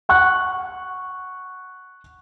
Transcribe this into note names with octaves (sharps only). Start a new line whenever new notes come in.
F#5 C#6 F#6